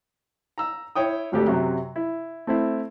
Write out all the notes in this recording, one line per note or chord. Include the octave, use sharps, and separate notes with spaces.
A#5 E6
E4 C#5 G5 D#6
G#1 D2 G4 A4
F#2 C3 F#3
E4
A3 C4 E4